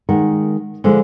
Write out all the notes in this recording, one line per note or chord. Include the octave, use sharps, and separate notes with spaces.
D#3 G#3 A#4 F#5
D3 F3 G#3 E4